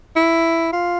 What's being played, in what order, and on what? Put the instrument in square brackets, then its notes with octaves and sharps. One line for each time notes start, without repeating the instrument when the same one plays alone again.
[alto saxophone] E4
F4